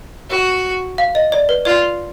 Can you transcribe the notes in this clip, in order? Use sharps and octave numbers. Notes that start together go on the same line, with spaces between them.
F#4
F5
D#5
D5
B4
F4 D5